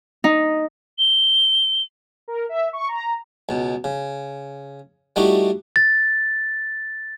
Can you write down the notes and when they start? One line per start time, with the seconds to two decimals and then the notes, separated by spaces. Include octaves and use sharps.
0.24 D#4
0.99 G7
2.28 A#4
2.49 E5
2.73 C#6
2.88 A#5
3.49 C#2 B2
3.84 C#3
5.16 G3 A3 D#4 E4 F#4 G4
5.76 A6